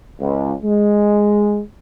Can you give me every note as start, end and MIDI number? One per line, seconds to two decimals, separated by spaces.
0.20 0.52 37
0.63 1.61 56